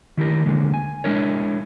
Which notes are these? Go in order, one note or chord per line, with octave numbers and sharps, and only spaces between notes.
D#3 E4 G4 A#4
D2 D3 G#3 A#3
G#5
G#3 D4 E4 A#4 C#5